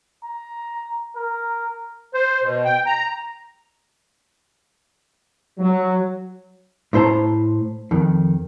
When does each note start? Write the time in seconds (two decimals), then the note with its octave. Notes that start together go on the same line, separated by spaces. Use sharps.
0.24 A#5
1.15 A#4
2.14 C5
2.43 B2
2.65 G5
2.86 A#5
5.59 F#3
6.93 A2 E4 C5 A5 A#5
7.91 F2 D#3